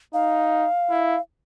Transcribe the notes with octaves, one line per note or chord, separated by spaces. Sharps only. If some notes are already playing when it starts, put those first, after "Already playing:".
D#4 F5
E4